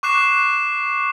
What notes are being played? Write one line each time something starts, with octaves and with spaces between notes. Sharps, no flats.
C#6 D6 F#6 C7 E7